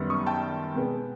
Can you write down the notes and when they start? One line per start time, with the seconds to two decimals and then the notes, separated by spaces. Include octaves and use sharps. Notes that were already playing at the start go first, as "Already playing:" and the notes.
Already playing: F#2 D#3 G3 B3
0.10 C#6 D#6
0.26 G5 A5
0.76 B2 G#3 B3